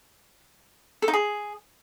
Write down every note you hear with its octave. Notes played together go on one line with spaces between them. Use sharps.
A4
D#4
G#4